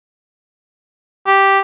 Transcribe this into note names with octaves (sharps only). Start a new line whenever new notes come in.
G4